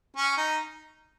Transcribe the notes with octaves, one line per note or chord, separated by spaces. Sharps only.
C#4
D#4